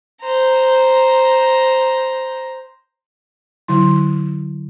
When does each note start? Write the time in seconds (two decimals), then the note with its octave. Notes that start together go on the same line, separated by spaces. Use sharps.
0.24 C5 A#5
3.68 D3 F#3 E4 C6